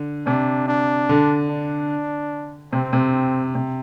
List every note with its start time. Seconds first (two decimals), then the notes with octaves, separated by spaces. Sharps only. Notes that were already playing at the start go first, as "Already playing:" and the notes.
Already playing: D3
0.26 C3 D4
0.68 D4
1.09 D3
1.49 D4
2.73 C3 C4
2.93 C3
3.55 C3